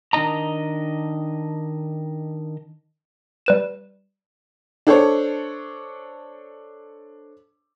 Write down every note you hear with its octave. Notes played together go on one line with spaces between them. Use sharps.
D#3 D4 D#4 D#5 A#5
G3 B4 E7
D4 A4 C5 C#5